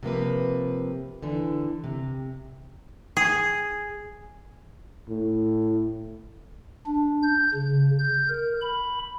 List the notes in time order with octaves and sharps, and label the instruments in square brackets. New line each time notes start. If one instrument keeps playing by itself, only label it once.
[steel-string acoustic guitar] C3 F3 A#3 B4
D3 E3
C3
[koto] G#4
[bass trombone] A2
[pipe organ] D4
G6
C#3
G6
A#4
B5